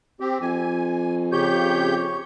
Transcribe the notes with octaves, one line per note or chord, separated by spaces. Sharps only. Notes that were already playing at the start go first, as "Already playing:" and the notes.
C4 G4
F2 G#5
C#3 G4 C#5 G6